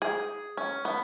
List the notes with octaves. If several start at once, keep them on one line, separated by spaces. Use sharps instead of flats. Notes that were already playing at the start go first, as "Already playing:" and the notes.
G#4
C#4
B3